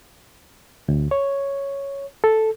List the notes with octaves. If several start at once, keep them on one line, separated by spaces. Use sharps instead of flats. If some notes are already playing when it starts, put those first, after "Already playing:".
D2
C#5
A4